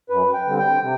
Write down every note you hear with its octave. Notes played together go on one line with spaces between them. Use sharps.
F#2 B4
G5
D3 G3 C4
G5
C3